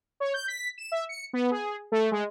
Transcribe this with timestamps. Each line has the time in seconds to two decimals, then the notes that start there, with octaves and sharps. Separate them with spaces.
0.20 C#5
0.34 G6
0.48 B6
0.78 E7
0.92 E5
1.09 C#7
1.33 B3
1.51 G#4
1.92 A3
2.12 G#3